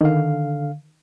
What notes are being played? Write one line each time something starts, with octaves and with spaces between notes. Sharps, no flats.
D3 D#3 F5